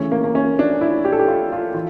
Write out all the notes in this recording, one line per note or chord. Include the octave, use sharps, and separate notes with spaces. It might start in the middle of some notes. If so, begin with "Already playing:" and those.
Already playing: D2 C#3 E3 C#4
A#3
A#3
C#4
D4
E4
G4
A4
G4
F4
F4
E3 F4